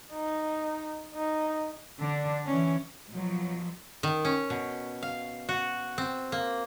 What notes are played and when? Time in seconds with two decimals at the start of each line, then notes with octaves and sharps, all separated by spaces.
0.12 D#4
1.15 D#4
2.00 D3 D4
2.46 E3 C#4
3.09 B2 F3 F#3
4.03 D#3
4.25 C#4
4.50 B2
5.03 F5
5.49 F#4
5.98 C4
6.32 A#3